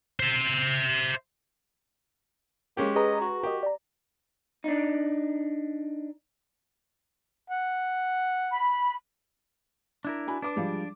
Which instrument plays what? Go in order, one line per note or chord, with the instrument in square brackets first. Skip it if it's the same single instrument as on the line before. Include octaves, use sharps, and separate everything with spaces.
[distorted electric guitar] C5 E5
[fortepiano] G#3 C#4 G4 [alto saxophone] A#3
[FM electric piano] G#4 B4 A#5 [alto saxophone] D#5
[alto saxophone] F#4
[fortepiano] G4 [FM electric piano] A#4 D#5
[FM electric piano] D5 A#5
[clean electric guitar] D4 D#4
[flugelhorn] F#5
[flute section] B5
[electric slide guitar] D4 E4 A#4
[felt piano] F#4 G#5 B5
[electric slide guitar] D4 [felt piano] B4 D6
[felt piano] F3 G3 G#3